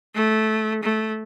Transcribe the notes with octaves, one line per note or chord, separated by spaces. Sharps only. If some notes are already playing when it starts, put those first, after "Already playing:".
A3
A3